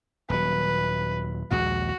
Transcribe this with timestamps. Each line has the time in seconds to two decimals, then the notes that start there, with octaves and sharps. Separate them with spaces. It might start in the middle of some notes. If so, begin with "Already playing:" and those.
0.30 D#1 F#3 B4
1.51 A#1 D#2 G#3 F#4